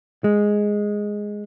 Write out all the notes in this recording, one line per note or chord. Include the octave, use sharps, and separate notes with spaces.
G#3